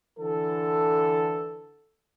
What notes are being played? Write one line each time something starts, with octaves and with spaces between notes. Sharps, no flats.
D3 E3 A4